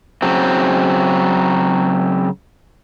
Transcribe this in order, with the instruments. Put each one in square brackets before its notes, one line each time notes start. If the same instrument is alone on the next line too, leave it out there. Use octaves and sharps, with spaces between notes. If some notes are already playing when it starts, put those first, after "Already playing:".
[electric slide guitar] C#3 F#3 C4